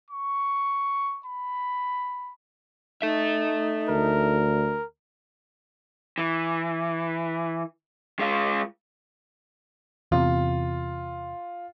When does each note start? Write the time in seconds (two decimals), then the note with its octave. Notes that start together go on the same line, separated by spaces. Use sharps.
0.10 C#6
1.26 B5
3.02 D#4 A4 E5
3.89 D2 A#4
6.18 E3
8.20 G#3 F4
10.12 E2 C3 F4